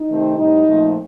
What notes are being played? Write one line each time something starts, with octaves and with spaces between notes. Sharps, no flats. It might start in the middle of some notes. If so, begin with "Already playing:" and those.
Already playing: D#4
C3 D#3 A3 C4
A2 G3 C4 D#4
A#2 F3 A3 C4